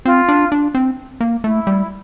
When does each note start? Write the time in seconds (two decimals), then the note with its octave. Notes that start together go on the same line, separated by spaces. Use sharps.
0.05 C4 F4
0.29 D4
0.52 D4
0.75 C4
1.21 A#3
1.44 A3 E4
1.67 G3